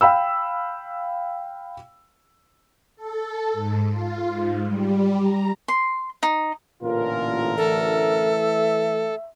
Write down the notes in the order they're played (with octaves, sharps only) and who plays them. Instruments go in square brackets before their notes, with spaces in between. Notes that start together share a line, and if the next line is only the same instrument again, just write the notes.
[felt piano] F5 G5 B5 E6
[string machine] A4
G#2
F4
G#2
G3
A#5
[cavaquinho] C6
D#4
[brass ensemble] A1 D3 A#4 [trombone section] A#2 [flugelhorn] F4
[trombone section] E3 A3 [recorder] A4 [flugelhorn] E5